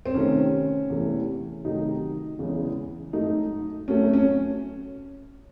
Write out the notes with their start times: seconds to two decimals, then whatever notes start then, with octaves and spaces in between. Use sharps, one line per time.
0.06 C4
0.14 C3 D#3 A3 C#4
0.89 E2 C3 E3 A3
1.65 C3 D#3 F#3 A3 D#4
2.39 E2 C#3 E3 G#3
3.13 G#2 F#3 A3 D#4
3.88 A2 F#3 A3 C#4
4.14 C#4